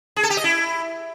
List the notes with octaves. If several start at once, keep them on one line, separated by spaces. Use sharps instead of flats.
G#4
A4
G4
D#5
E4